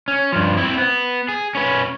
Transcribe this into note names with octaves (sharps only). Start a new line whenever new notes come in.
C#4
G2 F3
C4 E4
B3
G#4
C#4 B4